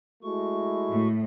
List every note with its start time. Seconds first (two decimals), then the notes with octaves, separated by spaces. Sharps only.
0.23 G#3 A3 E4 F#4 C#6
0.91 A2